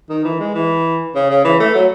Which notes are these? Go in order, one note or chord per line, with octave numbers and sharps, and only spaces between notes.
D#3
E3
G#3
E3
C#3
C#3
E3
A3
F#3